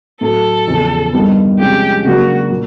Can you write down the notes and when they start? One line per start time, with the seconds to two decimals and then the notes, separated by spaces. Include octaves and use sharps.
0.21 A2 F#3 A3 A4
0.67 E2 C#3 F3 A3 C#4
1.13 G2 D#3 G3 B3
1.59 C3 F3 G#3 C#4 G4
2.04 C#3 F#3 A#3 D4 F#4
2.50 A#2 F3